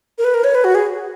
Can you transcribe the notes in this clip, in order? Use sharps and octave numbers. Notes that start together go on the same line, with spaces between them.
A#4
B4
A#4
C#5
B4
F#4
G#4